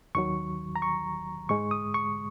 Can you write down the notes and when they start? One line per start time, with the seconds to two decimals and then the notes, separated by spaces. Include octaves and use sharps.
0.15 D#2 D#3 F#3 C#6
0.76 A#5
0.82 C#6
1.49 G#2 G#3 C#6
1.71 D#6
1.94 C#6